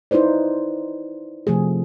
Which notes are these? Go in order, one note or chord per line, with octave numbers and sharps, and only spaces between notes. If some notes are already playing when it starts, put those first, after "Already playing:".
D#4 E4 B4 C5 D5
C3 F3 A3 G#4